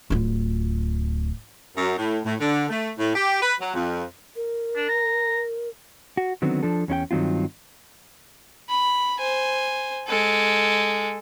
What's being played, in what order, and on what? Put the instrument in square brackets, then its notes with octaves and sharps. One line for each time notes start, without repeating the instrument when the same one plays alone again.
[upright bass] D1 F4
[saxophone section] F#2
A2
A2
D3
A3
A2
G4
B4
F#3
F2
[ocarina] A#4
[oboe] D4
A#5
[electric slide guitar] F#4
D3 D#3 F#3 B3 C4
F3 D4 A4
E2 C#4 E4 G5
G2 D#3 F#3 C4 F4
[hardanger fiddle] B5
C5 G#5
G#3 A4